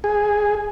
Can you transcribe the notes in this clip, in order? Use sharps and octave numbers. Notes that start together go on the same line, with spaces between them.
G#4